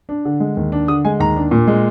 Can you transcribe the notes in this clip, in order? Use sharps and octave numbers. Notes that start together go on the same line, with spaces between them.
D4
D3
G#3
D#2
D4
D3 D#6
G#3 G#5
D#2 A#5
D4
A#2
G#3